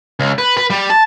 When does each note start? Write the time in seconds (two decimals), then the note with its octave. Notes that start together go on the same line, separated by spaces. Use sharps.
0.20 C#2
0.38 B4
0.57 B4
0.70 G3
0.90 A5